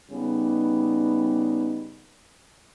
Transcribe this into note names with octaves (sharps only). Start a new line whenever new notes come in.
C#3 G3 B3 D#4